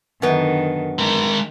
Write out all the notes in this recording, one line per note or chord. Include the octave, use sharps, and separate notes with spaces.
F#2 D3 D#3 B3
D#3 G#3 A#4